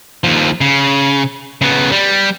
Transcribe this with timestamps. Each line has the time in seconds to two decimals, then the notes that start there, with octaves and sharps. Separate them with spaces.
0.24 D#2 F3
0.61 C#3
1.61 C#3 B3
1.92 G3